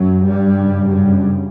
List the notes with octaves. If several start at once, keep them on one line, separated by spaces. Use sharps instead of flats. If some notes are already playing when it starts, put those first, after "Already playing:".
Already playing: F#2 F#3
G2 G3
F#2 C#3
G2 G3